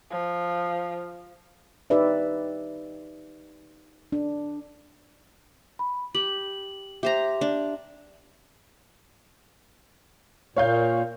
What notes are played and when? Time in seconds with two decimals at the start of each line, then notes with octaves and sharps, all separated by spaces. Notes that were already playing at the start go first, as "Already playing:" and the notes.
0.10 F3
1.90 D#4 G4 B4 D5 E5
4.12 D4
5.79 B5
6.15 G4 F#7
7.03 G4 C5 E5 A#5
7.41 D4
10.56 A#2 C#5 F5 G6